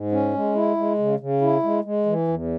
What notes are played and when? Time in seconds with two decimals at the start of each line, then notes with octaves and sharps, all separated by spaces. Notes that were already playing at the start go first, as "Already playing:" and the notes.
Already playing: G#2
0.12 C#4
0.33 G#3
0.55 E4
0.77 G#3
0.98 C#3
1.20 C#3
1.41 E4
1.63 G#3
1.84 G#3
2.06 E3
2.28 E2